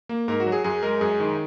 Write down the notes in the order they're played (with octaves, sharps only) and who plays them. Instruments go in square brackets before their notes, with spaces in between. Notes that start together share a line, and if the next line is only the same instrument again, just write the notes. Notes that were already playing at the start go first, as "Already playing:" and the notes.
[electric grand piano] A#3
G#2 A#4
F#4
F#3
G#4
F#2 G#4
G#3 A#4
F#2 G#4
D#3